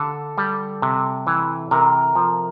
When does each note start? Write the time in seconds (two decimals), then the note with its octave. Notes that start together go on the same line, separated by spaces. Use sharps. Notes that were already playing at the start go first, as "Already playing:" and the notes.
Already playing: D3 A4
0.38 G3
0.82 C3
1.27 E3
1.71 C3 A#4
2.15 F3